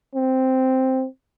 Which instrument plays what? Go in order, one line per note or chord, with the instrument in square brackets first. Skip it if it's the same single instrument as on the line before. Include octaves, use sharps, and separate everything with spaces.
[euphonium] C4